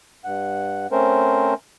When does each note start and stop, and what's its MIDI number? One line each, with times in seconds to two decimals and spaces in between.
0.24 0.87 43
0.24 0.87 78
0.92 1.54 57
0.92 1.54 60
0.92 1.54 61
0.92 1.54 70
0.92 1.54 72